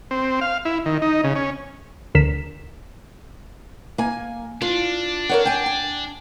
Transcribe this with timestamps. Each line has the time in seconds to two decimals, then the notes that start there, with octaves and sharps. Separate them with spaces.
0.11 C4
0.41 F5
0.65 E4
0.86 D#3
1.02 D#4
1.24 C#3
1.36 C#4
2.15 D2 D3 A#4 B6 E7
3.98 A#3 G#5
4.62 D4 F4
5.29 A#4 C#5 F#5
5.45 G5 G#5
5.66 G#5